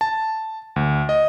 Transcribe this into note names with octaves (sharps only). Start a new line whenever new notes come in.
A5
D2
D#5